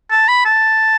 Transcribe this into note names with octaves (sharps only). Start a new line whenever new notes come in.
A5
B5
A5